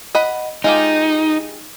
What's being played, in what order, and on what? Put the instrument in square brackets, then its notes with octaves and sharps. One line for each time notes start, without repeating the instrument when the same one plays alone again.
[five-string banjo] D#5 F#5 B5
[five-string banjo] G#3 F4 G4 [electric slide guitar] D#4